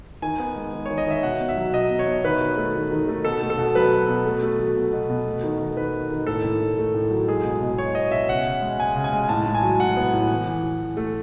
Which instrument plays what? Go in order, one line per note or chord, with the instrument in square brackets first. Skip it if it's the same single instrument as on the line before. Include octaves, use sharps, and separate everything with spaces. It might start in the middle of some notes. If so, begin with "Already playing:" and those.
[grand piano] D#3 G#5
B3
G#3
D#3
D#3 C#5
D#5
D#3 E5
B2 F#5
B2
E5
F#3
B2 D#5
B2
C#5
B2
D#3 B4
D#3
A3
D#3
D#3
A3
B2 A4
A3
A4
B2
F#3 B4
B2
B2
A3
A3
F#3
B2
B2
B2
A3
D#3
D#3
D#3 B4
D#3
D#3
A2 A4
A2
A2
A3
A2
F#3
G#3 G#4
B2
B2
B2 C#5
B3 D#5
B2 E5
C#3 F#5
C#3
G#3
G#3 G#5
C#3
G#5
G#3
A2 A5
A2
G#5
F#3
A2 F#5
B3
A2
E3
E3
E3
E3
A3